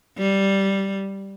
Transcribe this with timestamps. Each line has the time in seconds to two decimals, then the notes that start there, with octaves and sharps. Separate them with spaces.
0.18 G3